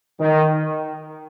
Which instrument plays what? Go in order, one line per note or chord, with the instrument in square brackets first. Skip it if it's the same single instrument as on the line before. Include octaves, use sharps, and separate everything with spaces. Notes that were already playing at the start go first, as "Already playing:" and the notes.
[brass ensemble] D#3